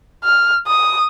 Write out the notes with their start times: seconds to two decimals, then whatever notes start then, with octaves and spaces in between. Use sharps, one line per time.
0.24 F6
0.67 D#6